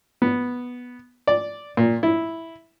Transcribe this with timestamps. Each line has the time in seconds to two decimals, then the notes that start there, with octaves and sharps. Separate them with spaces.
0.22 B3
1.27 D5
1.77 A#2
2.03 E4